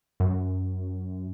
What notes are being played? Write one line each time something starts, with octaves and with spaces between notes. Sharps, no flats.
F#2